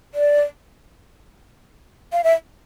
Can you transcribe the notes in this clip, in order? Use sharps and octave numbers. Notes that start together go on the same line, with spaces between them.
D5
F5
E5